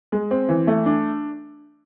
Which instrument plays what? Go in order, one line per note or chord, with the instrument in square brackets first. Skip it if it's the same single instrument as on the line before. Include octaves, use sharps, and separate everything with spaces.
[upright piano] G#3
C4
E3
A3
D4